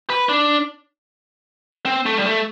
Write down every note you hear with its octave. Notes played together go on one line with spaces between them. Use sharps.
B4
D4
C4
A3
G3
A3